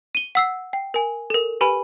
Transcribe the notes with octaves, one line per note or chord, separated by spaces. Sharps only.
D#7 G7
F#5 E6 C7
G5
A#4 G#5
A4 A#4
G4 B4 G#5 B5